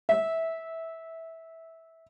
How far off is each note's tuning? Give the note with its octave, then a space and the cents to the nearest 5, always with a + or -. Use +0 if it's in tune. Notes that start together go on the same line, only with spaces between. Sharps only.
E5 -15